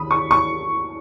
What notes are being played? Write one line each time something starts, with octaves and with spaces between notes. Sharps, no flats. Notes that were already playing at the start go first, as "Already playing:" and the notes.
Already playing: D#2 D#3 B5 D#6
C#6
C#6